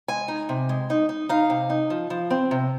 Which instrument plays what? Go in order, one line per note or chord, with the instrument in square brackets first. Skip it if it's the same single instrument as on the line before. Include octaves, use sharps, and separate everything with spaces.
[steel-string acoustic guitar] G#3 G#5
D#4
C3
G#3
D#4
D#4
D#4 F5
C3
D#4
F3
F3
C4
C3